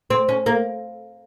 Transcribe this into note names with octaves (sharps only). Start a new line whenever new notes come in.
C4
C#4
A#3